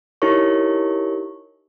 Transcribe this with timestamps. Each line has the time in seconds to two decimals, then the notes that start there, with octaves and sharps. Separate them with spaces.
0.22 D#4 E4 G4 A#4 C#5 C#6